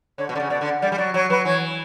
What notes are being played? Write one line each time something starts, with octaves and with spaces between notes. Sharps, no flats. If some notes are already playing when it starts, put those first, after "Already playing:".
D3 C#5
B2
D3 D5
C#3
B2 D5
D3
D5
G3 D5
G3
F#3 D5
F#3 C#5
F#3 B4
E3 C#5